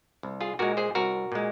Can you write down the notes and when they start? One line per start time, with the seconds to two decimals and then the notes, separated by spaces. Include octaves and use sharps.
0.23 C2
0.41 F4 G#4
0.59 A#2 G#3 F#4 A#4
0.77 G#4 C5
0.95 C2 F#4 A#4
1.32 A#2 G#3